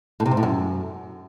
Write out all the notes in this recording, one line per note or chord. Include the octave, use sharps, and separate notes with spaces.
A2
C3
G#2
A2
F#2